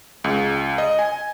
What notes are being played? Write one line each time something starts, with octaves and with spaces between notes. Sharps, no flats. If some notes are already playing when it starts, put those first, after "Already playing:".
C#2
D#5
G#5